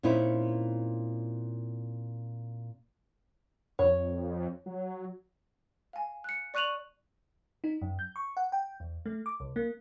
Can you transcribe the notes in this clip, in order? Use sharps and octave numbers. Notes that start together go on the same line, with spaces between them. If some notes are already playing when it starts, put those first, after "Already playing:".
A#2 C4 C#4 D#4 E4
F2 C#5
F#3
F5 G#5
F#6 C#7
D5 C#6 F#6 D#7 F7 F#7
D#4
F#2
G6
C#6
F#5
G5
E2
A3
D6
C2
A#3